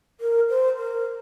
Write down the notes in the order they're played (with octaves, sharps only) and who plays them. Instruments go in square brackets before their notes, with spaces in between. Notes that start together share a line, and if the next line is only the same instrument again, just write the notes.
[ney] A#4
C5
A#4